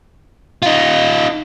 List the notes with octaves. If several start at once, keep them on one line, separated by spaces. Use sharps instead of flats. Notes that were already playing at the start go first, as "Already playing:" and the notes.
D#4 F4